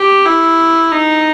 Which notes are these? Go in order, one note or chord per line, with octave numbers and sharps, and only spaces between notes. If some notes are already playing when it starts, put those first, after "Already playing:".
Already playing: G4
E4
D#4